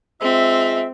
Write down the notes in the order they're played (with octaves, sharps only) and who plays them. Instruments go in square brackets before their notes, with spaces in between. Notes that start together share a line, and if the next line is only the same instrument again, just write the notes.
[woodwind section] G#3 F4 E5 [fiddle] C4